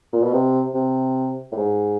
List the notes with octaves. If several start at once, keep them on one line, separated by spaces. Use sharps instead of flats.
A#2
B2
C3
C3
A2
G#2